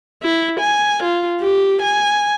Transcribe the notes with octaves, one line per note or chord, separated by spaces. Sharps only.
E4
G#5
F4
G4
G#5